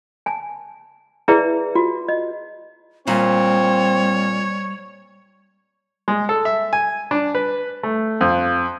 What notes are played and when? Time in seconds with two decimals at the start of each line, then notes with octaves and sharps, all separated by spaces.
0.26 G#5 A5
1.28 E4 G#4 B4 D5 E5 A#5
1.75 F4 F#4
2.08 D#5
3.07 A#2 G3 C4 C#5
6.08 G#3
6.29 A4
6.45 E5
6.73 G#5
7.11 D4
7.35 B4
7.83 A3
8.21 F2